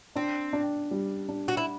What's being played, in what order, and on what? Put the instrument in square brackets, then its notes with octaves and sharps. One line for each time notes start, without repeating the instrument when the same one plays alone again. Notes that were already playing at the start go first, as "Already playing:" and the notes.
[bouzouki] C4 [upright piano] D4
[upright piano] D4
G3
D4
[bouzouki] F#4
E4